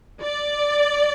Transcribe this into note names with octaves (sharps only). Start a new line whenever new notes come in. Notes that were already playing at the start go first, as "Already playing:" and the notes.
D5